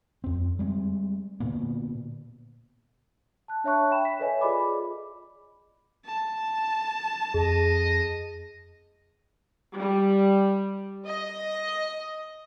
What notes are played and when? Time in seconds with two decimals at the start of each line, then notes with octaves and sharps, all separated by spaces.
0.24 F2 C4
0.59 G3 G#3 C4
1.40 A#2 D3 A#3 B3
3.48 A5 F#6
3.64 D4 C#5 E5 A5 C#6 F#6
3.91 E5 G5 B5 E7
4.05 B6
4.19 A4 B4 C#5 D#5 E5 G#5
4.41 F4 G#4 D5 D#5 B5 D6
6.06 A5
7.34 F2 G#4 D#5
9.75 G3
11.06 D#5